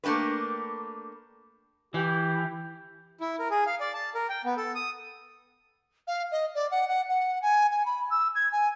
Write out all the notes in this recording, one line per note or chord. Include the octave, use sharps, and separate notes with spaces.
A3 A#3 D4 G4 B4
E3 G4
E4
A#4
G#4
F5
D5
A5
A#4
G5
B3
A4
D#6
F5
D#5
D5
F#5
F#5
F#5
G#5
G#5
B5
E6
G#6
G#5